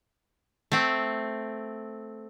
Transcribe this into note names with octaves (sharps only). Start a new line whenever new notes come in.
A3 C4